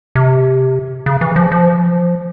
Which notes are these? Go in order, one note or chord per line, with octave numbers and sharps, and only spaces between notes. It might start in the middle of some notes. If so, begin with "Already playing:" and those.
C3
C#3
E3
F3
F3